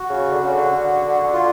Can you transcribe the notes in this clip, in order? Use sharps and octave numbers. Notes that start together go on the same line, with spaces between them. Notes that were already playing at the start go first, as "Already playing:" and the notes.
Already playing: F#4
C#3
D3
C#3
D3
F4